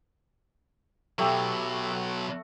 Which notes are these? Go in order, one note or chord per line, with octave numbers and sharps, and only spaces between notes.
B2 F#3 A3 G4 E6
F#5